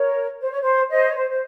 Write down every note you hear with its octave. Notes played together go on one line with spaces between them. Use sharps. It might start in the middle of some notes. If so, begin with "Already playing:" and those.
Already playing: A#4 C#5
C5
C#5
C5
C5 D#5
C#5
C5
C5